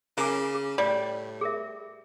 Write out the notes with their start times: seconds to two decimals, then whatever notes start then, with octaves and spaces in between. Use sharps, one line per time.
0.18 C#3 A#3 E4 G#5 D6
0.54 G#4
0.78 A2 G3 D5
1.41 G#4 A#4 E5